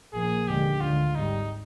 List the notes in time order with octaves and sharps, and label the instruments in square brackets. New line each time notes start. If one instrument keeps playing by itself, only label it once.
[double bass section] A#1 A#2 F3 A#3 [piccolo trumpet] G#4
[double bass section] F1 D#2 D3 G#3 [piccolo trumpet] G4
[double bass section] D2 D3 G#3 [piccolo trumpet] F4
[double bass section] G#1 G#2 G3 [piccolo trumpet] D#4